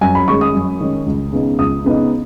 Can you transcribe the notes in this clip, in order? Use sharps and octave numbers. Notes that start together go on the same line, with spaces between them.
F#2 G#5
B5
D#3 G#3 C#4 C#6
D#6
F#2
D#3 G#3 C#4
C#2
C#3 B3 D#4
C#2 D#6
C#3 B3 D#4